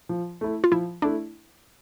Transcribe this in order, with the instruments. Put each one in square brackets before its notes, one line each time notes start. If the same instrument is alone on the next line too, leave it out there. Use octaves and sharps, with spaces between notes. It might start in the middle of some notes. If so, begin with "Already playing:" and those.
[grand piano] F3
A3 E4
[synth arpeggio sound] F4
[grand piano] F3 [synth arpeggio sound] E4
[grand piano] A3 E4 [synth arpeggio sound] D4